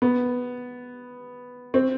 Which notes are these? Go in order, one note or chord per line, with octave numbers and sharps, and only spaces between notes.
B3
C4